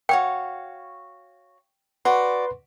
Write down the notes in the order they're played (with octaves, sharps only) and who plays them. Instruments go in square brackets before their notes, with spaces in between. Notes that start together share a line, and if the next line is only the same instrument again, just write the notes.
[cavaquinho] F#4 C#5 F5 [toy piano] G5
[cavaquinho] F#4 D5 [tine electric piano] B4 C6